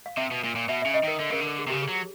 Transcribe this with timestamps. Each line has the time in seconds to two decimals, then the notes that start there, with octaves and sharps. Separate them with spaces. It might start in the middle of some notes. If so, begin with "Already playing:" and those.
0.06 F5
0.17 C3 E5
0.31 B2
0.44 A#2
0.56 A#2
0.69 B2 E5
0.82 C#3 E5
0.94 D#5
1.04 D#3 A#4
1.20 D3
1.31 C#3 A#4
1.41 D3
1.46 A4
1.59 G#4
1.67 C3
1.70 C#3 G4
1.82 G#4
1.88 F#3